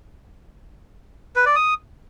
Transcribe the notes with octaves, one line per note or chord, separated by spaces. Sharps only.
B4
D5
D#6